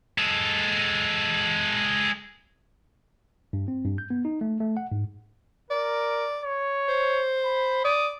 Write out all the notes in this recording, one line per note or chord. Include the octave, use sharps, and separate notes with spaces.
G#3 A4
G2
C4
G2
G6
B3
D#4
A3
A3
F#5
G#2
A#4 D5
C#5
C5
B5
D5 D#6